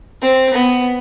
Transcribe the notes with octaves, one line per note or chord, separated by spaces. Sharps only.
C4
B3